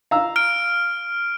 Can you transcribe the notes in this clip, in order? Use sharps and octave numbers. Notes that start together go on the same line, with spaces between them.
F5 A#5 E6
F6 D7